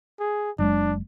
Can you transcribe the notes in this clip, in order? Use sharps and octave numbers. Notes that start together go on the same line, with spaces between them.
G#4
F#1 F#3 G#3 D4